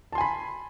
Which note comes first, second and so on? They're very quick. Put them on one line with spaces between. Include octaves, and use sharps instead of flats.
A5 C6 G#5 B5